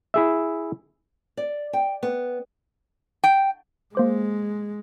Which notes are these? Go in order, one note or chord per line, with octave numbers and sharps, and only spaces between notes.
E4 G#4 E5
D5
G5
B3
G5
G#3 A#3 C5 D6